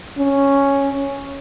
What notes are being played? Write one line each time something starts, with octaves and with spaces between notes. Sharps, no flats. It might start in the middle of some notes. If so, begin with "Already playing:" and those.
C#4